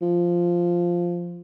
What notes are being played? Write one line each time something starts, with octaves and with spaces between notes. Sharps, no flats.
F3